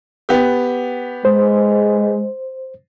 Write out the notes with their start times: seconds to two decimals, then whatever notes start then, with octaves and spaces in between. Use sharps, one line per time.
0.29 B3 G4
1.25 G#3 C5